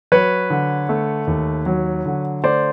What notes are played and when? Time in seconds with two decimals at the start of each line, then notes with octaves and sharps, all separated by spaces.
0.12 F#3 B4 C#5
0.50 D3
0.89 A3
1.27 D#2
1.66 F#3
2.06 D3
2.44 A3 C5 D5